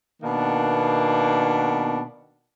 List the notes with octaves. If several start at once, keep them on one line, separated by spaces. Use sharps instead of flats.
B2 D#3 A#3 B3 D4